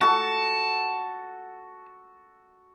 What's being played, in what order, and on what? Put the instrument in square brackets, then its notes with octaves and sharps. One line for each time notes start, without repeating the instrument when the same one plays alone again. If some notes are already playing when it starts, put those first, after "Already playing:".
[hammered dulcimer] F#4 A4 [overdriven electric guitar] A5